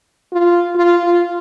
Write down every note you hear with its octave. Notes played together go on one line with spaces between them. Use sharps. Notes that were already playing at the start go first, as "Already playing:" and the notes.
F4
F4
F4